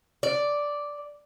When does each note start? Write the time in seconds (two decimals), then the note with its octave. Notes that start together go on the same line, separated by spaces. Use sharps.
0.23 D5